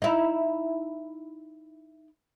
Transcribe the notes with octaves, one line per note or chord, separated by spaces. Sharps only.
D#4 E4